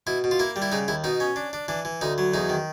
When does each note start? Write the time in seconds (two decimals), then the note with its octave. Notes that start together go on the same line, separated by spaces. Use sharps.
0.07 B2 E4
0.24 B2
0.31 F4
0.39 A#3 E4
0.56 G3
0.62 E4
0.72 C#3 D#4
0.88 D#2 E4
1.04 B2 D#4
1.20 C#4
1.36 D4
1.53 D4
1.68 E3 D4
1.85 E3
2.01 D2 D#4
2.18 F#3
2.34 E2 D#4
2.49 D#3